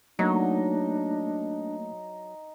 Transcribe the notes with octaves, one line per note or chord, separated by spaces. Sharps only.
F#3 A3 A#3 D4 D#4